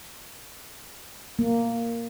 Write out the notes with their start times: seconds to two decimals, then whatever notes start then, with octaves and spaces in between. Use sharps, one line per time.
1.39 A#3